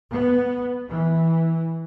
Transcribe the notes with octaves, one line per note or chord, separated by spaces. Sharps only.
B3
E3